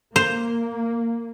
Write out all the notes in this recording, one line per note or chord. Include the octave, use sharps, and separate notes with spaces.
A#3 C5